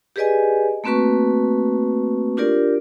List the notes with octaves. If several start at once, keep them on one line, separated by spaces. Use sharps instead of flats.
G4 G#4 B4 D5 D#5 G#5
A3 A#3 C4 F#4 B4 C#6
D4 F4 G4 A#4 D5